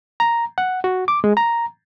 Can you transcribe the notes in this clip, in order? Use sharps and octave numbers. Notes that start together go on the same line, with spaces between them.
A#5
F#5
F#4
D6
G#3
A#5